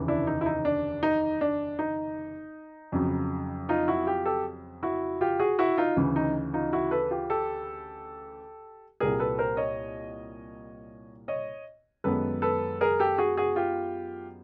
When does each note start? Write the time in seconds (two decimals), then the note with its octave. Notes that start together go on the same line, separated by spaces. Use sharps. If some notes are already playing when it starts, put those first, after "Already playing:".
Already playing: F1 D#2 C#3 E3
0.08 D4 E4
0.27 D#4
0.41 E4
0.46 D#4
0.65 D4
1.03 D#4
1.41 D4
1.79 D#4
2.92 F2 C#3 F#3
3.69 D#4 F4
3.88 E4 F#4
4.06 F4 G4
4.25 G4 A4
4.83 E4 F#4
5.21 F4 G4
5.40 F#4 G#4
5.59 E4 F#4
5.78 D#4 F4
5.96 D2 C#3 E3
6.16 D#4
6.53 D#4 F4
6.73 E4 F#4
6.91 A4 B4
7.11 F4 G4
7.30 G4 A4
9.00 C2 A#2 G3 G#4 A#4
9.20 A4 B4
9.38 A#4 C5
9.57 C#5 D#5
11.28 C#5 D#5
12.04 F#2 D#3 G#3 B3 A4 B4
12.42 A4 B4
12.81 G#4 A#4
12.99 G4 A4
13.18 F#4 G#4
13.37 F#4 G#4
13.56 F4 G4